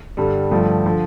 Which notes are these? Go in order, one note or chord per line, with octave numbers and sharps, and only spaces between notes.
G2 D3 G3
G2 D3 F3 A3
D3 F3